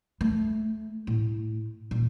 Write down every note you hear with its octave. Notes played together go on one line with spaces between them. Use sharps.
A3
A2
A#2